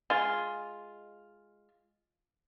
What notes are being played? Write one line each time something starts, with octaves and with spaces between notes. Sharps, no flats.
G#3 F4